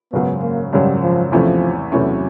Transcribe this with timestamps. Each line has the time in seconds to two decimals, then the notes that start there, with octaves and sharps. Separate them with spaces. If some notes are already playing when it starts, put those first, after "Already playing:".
0.12 G#1 F#2 C#3 F#3 B3
0.42 A#3
0.72 G#1 F#2 C#3 F#3 G3
1.03 F3
1.32 E2 C3 E3 F3 A3 C#4
1.92 E2 C3 E3 F#3 A3 C#4